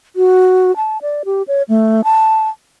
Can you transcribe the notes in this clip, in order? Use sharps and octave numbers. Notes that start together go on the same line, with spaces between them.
F#4
A5
D5
G4
C#5
A3
A5